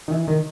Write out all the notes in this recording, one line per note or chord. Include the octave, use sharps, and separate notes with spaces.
D#3
E3
D#3